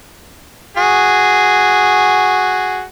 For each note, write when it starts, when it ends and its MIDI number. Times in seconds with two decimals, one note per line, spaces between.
0.77 2.83 66
0.77 2.83 68